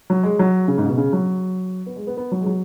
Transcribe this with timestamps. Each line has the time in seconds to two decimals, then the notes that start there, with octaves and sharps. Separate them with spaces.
0.10 F#3
0.23 G#3
0.39 F#3
0.68 C#3
0.78 G#2
0.83 C#3
0.88 B2
0.97 C#3
1.13 F#3
1.86 B3
1.96 G#3
2.07 B3
2.17 B3
2.32 F#3
2.41 G#3
2.46 F#3